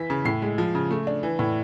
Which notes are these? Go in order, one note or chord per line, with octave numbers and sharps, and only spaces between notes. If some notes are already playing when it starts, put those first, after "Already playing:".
Already playing: E3 B6
C#3
A2 C7
G#3
F3
C#3
A3
D4
E3
A2